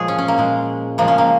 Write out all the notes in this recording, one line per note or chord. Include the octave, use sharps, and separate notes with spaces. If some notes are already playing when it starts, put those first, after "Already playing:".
Already playing: A#2 F3 G#3 G#4 C#5
C#4
C#4
A#3
A#2 G#3
C#3 F3 G#3 A#3
C#4
A#3